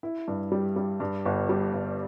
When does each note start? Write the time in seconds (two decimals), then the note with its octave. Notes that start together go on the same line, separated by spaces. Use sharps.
0.03 E4
0.28 G2
0.52 G3
0.76 G3
1.00 G2
1.25 G1
1.49 G3
1.73 G1